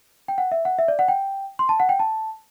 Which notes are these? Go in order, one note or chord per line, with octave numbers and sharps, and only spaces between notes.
G5
F#5
E5
F#5
E5
D5
F#5
G5
C6
A5
F#5
G5
A5